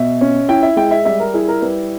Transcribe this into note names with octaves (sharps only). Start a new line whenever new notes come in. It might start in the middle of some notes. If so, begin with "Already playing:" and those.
Already playing: B2 E5
C#4
E4 G5
E5
G#3 G5
E5
G3 E5
A#4
E4 G#4
A#4
G3 B4